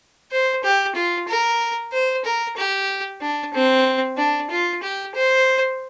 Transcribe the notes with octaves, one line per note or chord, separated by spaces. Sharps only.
C5
G4
F4
A#4
C5
A#4
G4
D4
C4
D4
F4
G4
C5